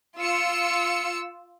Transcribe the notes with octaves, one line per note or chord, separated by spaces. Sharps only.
F4 E6 C#7